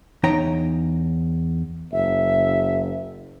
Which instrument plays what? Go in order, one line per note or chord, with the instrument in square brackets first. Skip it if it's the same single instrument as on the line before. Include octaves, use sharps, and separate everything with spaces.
[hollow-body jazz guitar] E2 D#4 C#5 G5 A#5
[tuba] F#1 [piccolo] E5